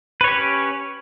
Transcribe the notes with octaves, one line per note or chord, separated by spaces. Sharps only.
C#4 G4 B4 C#5